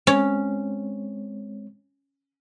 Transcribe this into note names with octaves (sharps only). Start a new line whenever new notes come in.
G#3 C4 C#4 C#5